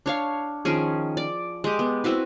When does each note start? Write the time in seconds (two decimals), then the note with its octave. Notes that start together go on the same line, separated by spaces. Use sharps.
0.06 D4 C#5 F5
0.65 D#3 F3 C#4 G#4
1.17 D5
1.64 G#3 G4
1.79 B3
2.04 C4 E4 F#4 B4